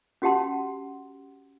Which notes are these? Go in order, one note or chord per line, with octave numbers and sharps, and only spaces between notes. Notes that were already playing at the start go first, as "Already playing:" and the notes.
C#4 F#4 G4 F#5 A5 C6